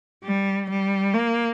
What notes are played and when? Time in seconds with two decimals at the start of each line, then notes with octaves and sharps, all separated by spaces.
0.24 G3
0.70 G3
1.14 A#3